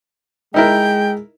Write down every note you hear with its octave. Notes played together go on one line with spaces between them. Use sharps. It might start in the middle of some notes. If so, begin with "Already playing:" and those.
G#3 D#4 E4 A#4 G5